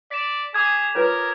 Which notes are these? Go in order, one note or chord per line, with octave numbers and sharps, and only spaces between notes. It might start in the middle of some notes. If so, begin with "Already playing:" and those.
D5 B6 E7
G#4 D6 D#6 G#6
F4 A#4 B4 C#5